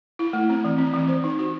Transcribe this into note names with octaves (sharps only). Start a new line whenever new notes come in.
E4
A3
C4
E3
C4
E3
C5
D#4
F#4